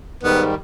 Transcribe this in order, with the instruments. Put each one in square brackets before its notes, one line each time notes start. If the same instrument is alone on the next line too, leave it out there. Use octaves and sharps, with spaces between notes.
[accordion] G#2 D#3 G3 [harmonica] B3